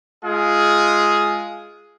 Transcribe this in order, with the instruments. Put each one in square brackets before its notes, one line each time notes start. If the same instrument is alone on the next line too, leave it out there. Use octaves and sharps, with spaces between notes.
[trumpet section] G#3 F4 G#4